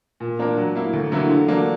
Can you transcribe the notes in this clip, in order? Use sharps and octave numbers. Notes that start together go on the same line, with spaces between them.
A#2
A#3 D4 A#4
F#3
A#3 E4
D2
D3 F#3 A#3 E4
D3
F#3 A#3 D4